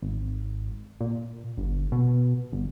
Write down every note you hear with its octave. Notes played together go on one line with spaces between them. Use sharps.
G#1
A#2
G1
B2
G1